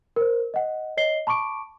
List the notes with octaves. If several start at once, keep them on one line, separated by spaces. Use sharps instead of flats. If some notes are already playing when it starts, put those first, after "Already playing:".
A#4 C5
D#5 F#5
C#5 D#5 C7 G7
A5 B5 C#6 D6 D7